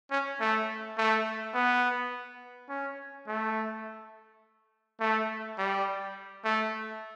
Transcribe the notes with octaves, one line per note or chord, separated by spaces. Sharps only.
C#4
A3
A3
B3
C#4
A3
A3
G3
A3